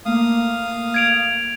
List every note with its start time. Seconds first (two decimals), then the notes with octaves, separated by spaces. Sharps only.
0.05 A3 A#3 F5 D#6
0.94 G#6 D7 F7